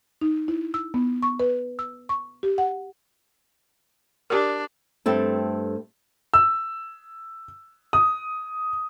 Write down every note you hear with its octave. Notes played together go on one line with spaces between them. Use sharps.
D#4
E4
E6
B3
C#6
B4
E6
C#6
G4
F#5
D4 G4 A#4
G2 A3 C4 A4
E6
D#6